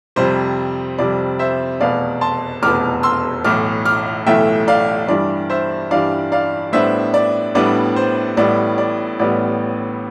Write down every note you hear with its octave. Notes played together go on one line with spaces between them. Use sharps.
F2 C3 G3 C5
F2 C3 G3 D5
C5 E5
F1 E2 B2 B3 D5 F5
A5 C6
F1 E2 B2 B3 D6 F6
C6 E6
B1 A2 E3 A3 D6 F6
D6 F6
B1 A2 E3 A3 E5 G5
D5 F5
G2 E3 G3 D4 D5
C5 E5
G2 E3 G3 D4 D5 F5
D5 F5
A2 G3 B3 D4 C5 E5
D5
A2 G3 B3 D4 D5
C5
A1 A2 G3 B3 D5
D5
A1 A2 G3 B3 D5